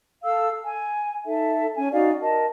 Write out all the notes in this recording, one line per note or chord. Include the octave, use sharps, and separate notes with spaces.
A4 F5 E6
G#5
D#4 A4 E5
C#4 G#5
D#4 F#4 D5 F5
A#4 D#5 A5